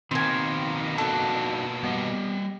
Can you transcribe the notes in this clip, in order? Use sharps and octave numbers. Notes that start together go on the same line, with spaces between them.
B2 D#3 A#3 C4 C5 G#5
D4 D#4 F#4 A4
G3 B3 G4 D#5